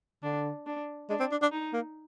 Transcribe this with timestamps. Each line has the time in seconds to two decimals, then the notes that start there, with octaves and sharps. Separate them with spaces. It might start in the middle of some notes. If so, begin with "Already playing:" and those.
0.23 D3 D4
0.66 D4
1.09 G#3 D4
1.20 C4
1.31 D4
1.42 D4
1.52 D#4
1.73 A#3